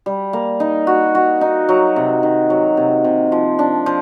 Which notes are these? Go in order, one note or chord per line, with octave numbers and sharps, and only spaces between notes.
G3
A#3
D#4
F#4
F#4
D#4
F#3
C3
D#3
F#3
C3
C3
F3
D4
F3